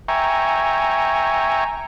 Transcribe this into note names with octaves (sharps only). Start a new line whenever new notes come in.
E5 G5 G#5 A#5 C#6